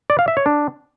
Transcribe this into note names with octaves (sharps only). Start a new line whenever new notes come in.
D5
F5
E5
C#5
D4